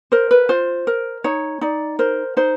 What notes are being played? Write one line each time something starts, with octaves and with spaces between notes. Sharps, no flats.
A#4 C5
B4
F4 C5
A#4
D#4 C#5
D#4 D5
A#4 C5
D#4 C5